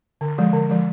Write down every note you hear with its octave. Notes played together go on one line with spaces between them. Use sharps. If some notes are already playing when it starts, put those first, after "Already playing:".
D3
F3 G#3
D3
F3 G#3